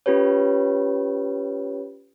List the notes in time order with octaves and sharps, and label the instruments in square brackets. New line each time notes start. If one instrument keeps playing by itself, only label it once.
[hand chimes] C#4 F4 G4 B4 C#5